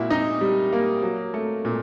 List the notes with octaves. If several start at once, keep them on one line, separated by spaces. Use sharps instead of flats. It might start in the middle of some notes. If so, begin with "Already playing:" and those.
Already playing: A#2 A#3 E4 F#4 E5
D#4 D#5
G3
A#3
F#3
A3
A#2